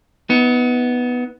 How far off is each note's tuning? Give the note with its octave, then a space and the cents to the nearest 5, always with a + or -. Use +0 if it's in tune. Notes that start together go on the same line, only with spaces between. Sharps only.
B3 +0 D#4 +35